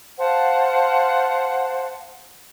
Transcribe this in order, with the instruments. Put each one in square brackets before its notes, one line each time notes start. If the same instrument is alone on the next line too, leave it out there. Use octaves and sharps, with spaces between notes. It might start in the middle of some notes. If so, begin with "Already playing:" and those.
[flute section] C5 F5 F#5 A5